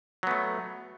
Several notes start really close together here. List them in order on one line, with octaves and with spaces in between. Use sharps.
F#3 B3 A3